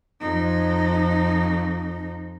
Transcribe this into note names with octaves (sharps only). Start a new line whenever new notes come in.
F2 D#4